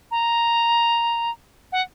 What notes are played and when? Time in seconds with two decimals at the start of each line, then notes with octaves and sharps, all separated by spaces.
0.11 A#5
1.72 F#5